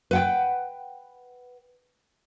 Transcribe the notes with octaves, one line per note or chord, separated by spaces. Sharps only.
B4 F#5 G5